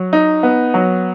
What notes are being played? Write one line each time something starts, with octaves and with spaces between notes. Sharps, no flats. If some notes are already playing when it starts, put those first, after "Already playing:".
Already playing: F#3
D#4
B3
F#3